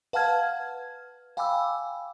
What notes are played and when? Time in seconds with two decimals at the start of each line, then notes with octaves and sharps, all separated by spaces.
0.13 B4 F5 F#5 A5 F6 G#6
1.37 F5 G5 G#5 B5 D6 E6